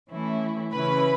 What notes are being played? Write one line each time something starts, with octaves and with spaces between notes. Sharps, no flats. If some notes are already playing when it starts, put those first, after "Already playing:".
E3 A3 C#4 E4
C#3 E3 C#4 E4 B4 B5